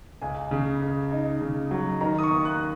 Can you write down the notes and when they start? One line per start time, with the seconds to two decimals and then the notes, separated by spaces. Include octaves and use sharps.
0.22 C#2 G#5
0.51 C#3
0.82 C#2
1.12 D#4
1.41 C#3
1.71 F#3
2.01 D#3 A#5
2.18 D#6
2.23 C#6
2.31 D#2
2.45 F#6